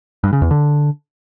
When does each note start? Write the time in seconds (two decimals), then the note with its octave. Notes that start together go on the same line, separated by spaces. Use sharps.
0.24 G2
0.33 C#3
0.42 E2
0.51 D3